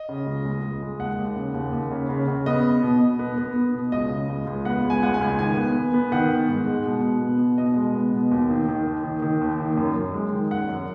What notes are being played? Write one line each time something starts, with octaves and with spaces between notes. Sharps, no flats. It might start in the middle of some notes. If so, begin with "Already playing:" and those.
Already playing: D#5
C#3
C#2
C#2
C#2
G#3
D#2 F#5
D#2
C#3
D#2
D#2
C#3
C#3
C#3
B3 D#5
B3
B2
B2
B3
B3
B3
B2
C#2 D#5
C#3
C#2
C#2
B3 F#5
C#2
G#5
C#2 F#5
G#5
C#2
D#3 G#5
B3
B3
B3
D#3 F#5
B3
G#2
G#3
B2
B2
B3
B2
B2 D#5
G#3
B3
B2
D#2
D#3
D#3
D#2
D#3
D#3
D#2
D#3
F#2
F#2
G#3
D#3
F#2 F#5
F#2